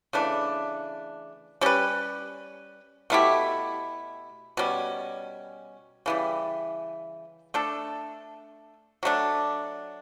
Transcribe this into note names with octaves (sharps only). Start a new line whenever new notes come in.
C#3 E3 A3 D4
G3 C#4 G4 B4
B2 A3 E4 G4
B2 G3 C#4
C#3 E3 G3
A3 D4 A4
F#3 A3 D4